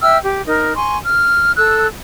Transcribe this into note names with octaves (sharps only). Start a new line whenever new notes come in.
E5 G5 E6 F6
G4
D#4 A#4
G#5 C6 C#6
F6
A4 E6 F#6